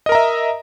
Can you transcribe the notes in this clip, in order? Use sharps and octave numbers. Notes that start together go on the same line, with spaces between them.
A#4 D#5 E5 A#5